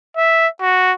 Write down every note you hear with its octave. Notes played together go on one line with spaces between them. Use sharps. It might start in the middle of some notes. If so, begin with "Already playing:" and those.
E5
F#4